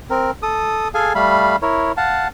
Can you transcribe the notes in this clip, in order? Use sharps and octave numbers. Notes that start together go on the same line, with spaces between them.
C4 A#4
A4 D#6
G#4 A4 F5 G#5
G3 A3 F5 B5
E4 A#4 C#5
F5 F#5 A5